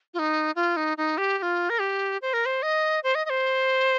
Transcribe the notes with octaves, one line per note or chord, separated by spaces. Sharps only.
F4
D#4
F4
D#4
D#4
G4
G4
F4
A#4
G4
C5
A#4
C5
D#5
C5
D#5
D#5
C5